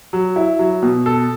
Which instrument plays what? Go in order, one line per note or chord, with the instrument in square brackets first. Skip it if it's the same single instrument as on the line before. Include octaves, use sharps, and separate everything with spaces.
[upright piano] F#3
E4
F#3
B2
A4